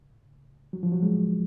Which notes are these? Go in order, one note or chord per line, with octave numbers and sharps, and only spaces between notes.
F#3
F3
F#3
G#3